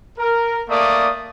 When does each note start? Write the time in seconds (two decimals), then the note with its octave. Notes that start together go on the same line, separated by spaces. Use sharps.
0.19 A#4
0.69 A3 A#3 D5 D#6